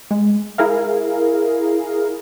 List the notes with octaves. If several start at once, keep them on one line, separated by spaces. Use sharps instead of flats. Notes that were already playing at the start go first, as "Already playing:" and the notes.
G#3
E4 G#4 A#4 F5